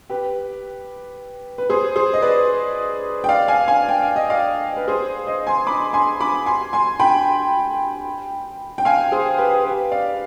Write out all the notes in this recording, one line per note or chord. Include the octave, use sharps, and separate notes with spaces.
G4 B4
B4
G#4 C5
G#4 C5
D#5
B4 D5
G5
D5 F5
F5 G#5
F5 G#5
G5
F5
D#5
D5 F5
B4
G#4 C5
C5 D#5
G#5 C6
B5 D6
G#5 C6
B5 D6
G#5 C6
G#5 C6
G5 B5
G5
F5 G#5
G#4 C5
G4 B4
G4 B4
D5 F5